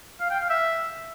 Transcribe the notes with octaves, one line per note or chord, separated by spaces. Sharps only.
F5
G5
F5
E5